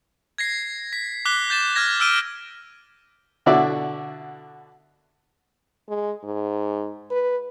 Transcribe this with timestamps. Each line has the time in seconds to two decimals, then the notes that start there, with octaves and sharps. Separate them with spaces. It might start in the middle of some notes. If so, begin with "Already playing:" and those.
0.38 G#6 A#6 C7
0.93 B6
1.25 D6 F#6 B6 G7
1.50 G6 A6 E7
1.76 F6 F#6 G#6 A#6
2.00 E6 F6 D7 D#7 G7
3.46 B2 D3 E4 F#4 D5 E5
5.88 G#3
6.24 G#2
7.11 B4